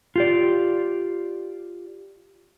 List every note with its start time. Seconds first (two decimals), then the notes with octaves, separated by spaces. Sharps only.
0.16 F4 G4 D5